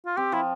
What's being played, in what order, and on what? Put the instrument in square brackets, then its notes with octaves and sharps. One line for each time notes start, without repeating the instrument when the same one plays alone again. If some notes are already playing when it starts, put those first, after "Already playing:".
[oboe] F4
[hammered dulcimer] C4 [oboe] G4
[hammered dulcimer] F3 [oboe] E4